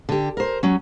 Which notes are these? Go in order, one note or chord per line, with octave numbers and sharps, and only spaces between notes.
D3 G4
A#4 C5
F#3 C#4